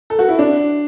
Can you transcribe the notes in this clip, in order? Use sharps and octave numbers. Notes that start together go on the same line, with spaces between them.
A4
F#4
E4
D4